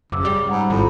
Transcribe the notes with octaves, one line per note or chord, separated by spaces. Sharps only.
F#1 C#3 D6 E6
G3
G#2 F#5 A#5 B5
G#1 F2 E4 A4 B5